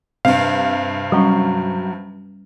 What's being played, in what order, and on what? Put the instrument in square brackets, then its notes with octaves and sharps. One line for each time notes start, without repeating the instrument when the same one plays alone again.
[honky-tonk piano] G2 C3 [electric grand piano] F5
[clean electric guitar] F#3 [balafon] G3 C#4